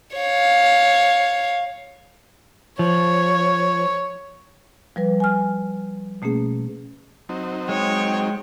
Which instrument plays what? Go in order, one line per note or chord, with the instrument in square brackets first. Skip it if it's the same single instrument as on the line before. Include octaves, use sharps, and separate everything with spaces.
[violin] C#5 F5
[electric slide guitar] F3 [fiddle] C#5
[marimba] F3 G3 B4
G#5 F6
B2 A3 A#3 C#4 G#4
[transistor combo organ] F#3 C4 D#4
[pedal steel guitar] G#3 [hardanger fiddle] C#5 [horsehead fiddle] G5